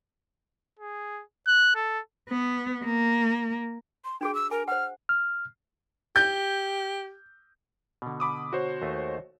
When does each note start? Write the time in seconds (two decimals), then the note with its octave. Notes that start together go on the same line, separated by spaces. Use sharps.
0.79 G#4
1.47 F#6
1.76 A4
2.29 B3
2.84 A#3
4.05 C6
4.21 D4 F#4 G#4 G5
4.35 E6
4.51 A#4 G#5
4.68 C5 F#5 F6
5.09 F6
6.16 G4 G6
8.02 B2 D3
8.20 B5 D6 D#6
8.53 F#4 C5 C#5
8.82 D#2 A3 D#4